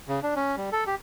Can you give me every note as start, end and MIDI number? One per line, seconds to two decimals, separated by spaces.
0.08 0.20 49
0.23 0.34 62
0.36 0.56 61
0.57 0.70 55
0.72 0.84 69
0.87 0.95 67